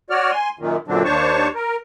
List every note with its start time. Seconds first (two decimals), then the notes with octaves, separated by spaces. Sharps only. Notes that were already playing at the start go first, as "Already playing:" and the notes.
0.10 F#4 C#5 D5 F6
0.31 G#5 C6
0.59 F#2 A#2 D#3
0.88 F#2 A#2 D3 F#3 C4 D4
1.04 D#2 D4 C5 C#5 A5 C#6
1.55 A#4